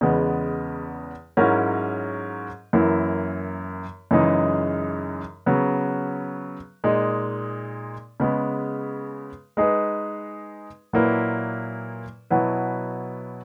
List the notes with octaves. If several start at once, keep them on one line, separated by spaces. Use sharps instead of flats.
E2 C#3 G#3 B3
G#2 F#3 C#4 E4 A#4
F#2 E3 A#3 E4
F#2 C#3 E3 G#3 D#4
C#3 F#3 B3
A#2 G#3 D#4
C#3 G#3 B3
G#3 D#4 G#4 B4
A#2 F#3 A#3 E4 B4
B2 F#3 B3 E4 B4